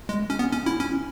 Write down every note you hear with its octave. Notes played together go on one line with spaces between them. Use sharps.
G#3
C#4
B3
C#4
E4
C#4